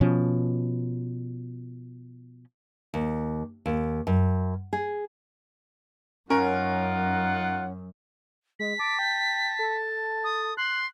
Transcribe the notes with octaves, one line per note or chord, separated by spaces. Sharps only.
B2 F3 C#4
D#2
D#2
F#2
G#4
F#2 C#4 D#4 F4 A#4 F#5
G#3 B6
A5 D6
G5
A4
D#6
C6 F#6